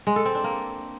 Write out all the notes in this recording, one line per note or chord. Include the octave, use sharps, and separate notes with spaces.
G#3
A4
C4
D4
A#3